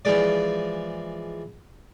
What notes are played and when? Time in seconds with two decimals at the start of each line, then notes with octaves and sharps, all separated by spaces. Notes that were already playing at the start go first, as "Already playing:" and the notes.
0.05 E3 F3 G#3 D5